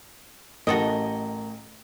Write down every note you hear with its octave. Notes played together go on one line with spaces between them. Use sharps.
A1 F#4 A4 A#4 D#5